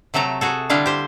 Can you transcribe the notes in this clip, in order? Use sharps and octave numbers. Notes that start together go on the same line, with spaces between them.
C3 F#3 A3 A4 A#5
F#4 G#4 A4
D3 G3 D4 E4 F5
G4 C5